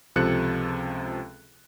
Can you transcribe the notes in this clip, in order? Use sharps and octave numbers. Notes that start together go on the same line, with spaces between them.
C#2 C3 F3 A4 F#6 C#7